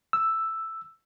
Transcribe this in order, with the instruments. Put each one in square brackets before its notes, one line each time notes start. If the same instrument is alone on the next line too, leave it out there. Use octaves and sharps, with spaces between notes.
[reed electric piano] E6